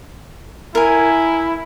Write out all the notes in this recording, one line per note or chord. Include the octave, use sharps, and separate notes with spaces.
E4 A#4 G#5